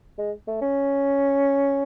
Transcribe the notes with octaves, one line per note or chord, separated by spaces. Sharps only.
G#3
A3
C#4